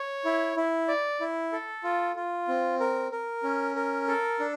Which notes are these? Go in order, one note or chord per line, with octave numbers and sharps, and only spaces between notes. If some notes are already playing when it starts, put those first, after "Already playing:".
Already playing: C#5
E4
E4
D5
E4
A4
F4
F4
C4
A#4
A#4
C#4
A#4
A4
D4